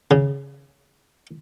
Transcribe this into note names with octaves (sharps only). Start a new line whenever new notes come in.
C#3